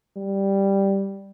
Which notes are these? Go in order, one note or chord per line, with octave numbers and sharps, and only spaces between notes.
G3